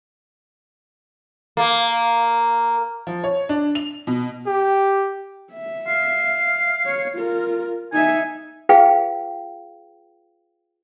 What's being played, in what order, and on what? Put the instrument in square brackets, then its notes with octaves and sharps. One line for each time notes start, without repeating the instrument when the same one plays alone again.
[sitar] A#3
[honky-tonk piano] F3
C#5
D4
F7
B2
[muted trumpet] G4
[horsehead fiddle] E5
[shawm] F5
[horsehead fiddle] C#5
F4 A#4
[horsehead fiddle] D#4 E5 [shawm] G#5
[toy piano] F4 G#4 B4 F5 G5